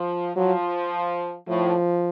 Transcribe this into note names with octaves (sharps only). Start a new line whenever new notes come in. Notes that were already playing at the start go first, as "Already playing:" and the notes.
Already playing: F3
F3 F#3
A2 F3